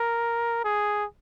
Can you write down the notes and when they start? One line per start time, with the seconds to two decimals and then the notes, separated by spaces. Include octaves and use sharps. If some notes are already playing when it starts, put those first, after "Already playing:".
Already playing: A#4
0.64 G#4